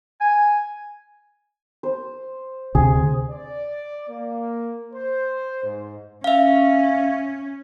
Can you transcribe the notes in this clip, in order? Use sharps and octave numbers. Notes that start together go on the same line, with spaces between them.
G#5
C5
D2 C3 G#4
D5
A#3
C5
G#2
C#4 E5 F5